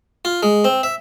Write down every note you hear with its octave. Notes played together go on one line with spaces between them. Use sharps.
F4
G#3
C4
E5